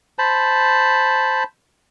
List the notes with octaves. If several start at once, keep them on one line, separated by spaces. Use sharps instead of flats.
C5 A5 B5